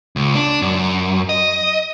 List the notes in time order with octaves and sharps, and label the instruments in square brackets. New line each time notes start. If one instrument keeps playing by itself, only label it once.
[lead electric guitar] C#2
D4
F#2
D#5